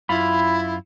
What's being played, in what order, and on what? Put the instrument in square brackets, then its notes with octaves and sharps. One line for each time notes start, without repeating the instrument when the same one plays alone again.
[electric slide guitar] F#2 F4 [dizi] E4 [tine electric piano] B5